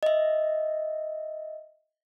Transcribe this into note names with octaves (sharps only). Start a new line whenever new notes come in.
D#5 E5